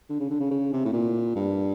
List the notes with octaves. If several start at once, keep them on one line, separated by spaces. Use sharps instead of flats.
D3
C#3
D3
C#3
C#3
C3
A2
A#2
G2